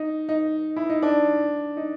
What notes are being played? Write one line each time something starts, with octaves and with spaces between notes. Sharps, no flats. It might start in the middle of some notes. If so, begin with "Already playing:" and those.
Already playing: D#4
D#4
E4
D#4
D4
D#4